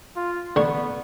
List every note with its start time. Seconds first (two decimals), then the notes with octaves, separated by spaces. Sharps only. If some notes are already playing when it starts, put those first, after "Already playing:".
0.16 F4
0.56 D3 B3 C#6